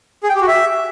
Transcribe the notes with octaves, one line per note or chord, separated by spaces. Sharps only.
G#4
G5
G4
F#4
E5